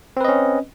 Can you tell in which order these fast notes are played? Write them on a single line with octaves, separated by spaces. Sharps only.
C4 B4 D#5 C#4